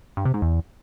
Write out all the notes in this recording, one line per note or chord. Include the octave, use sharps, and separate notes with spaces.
G2
C3
G#2
E2